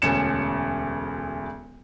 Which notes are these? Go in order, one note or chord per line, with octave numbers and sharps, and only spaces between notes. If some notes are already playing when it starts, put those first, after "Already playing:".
E1 D2 C#4 C#7 E7